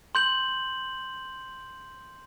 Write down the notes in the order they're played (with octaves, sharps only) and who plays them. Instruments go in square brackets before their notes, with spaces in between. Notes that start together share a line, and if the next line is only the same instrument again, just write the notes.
[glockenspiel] C6 G6 F#7